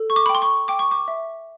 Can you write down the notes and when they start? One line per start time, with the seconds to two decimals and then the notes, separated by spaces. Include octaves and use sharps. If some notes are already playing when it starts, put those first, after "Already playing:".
Already playing: A4
0.10 C#6
0.16 D6
0.26 B5
0.29 G5
0.35 C6
0.42 C#6
0.68 G5 D6
0.79 C#6
0.91 D6
1.08 E5